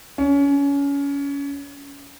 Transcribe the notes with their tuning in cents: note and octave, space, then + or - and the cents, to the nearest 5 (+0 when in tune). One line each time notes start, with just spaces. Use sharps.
C#4 +25